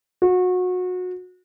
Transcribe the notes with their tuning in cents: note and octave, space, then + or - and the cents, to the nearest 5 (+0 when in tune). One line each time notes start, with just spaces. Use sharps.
F#4 -25